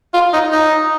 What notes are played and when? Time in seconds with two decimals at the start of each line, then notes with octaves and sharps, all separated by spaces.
0.14 F4
0.33 D#4
0.52 D#4